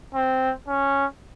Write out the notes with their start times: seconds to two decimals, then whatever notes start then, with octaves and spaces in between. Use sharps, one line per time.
0.14 C4
0.68 C#4